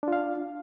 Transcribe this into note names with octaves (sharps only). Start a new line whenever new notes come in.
D4 F4 F5